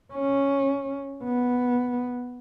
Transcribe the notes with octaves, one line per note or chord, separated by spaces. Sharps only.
C#4
B3